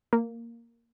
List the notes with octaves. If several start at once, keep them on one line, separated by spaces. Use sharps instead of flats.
A#3